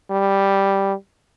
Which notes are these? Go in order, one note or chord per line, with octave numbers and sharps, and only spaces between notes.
G3